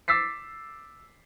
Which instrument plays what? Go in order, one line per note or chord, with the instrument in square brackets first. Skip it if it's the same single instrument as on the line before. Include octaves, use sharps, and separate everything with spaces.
[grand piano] D6 E6 A6 B6 C7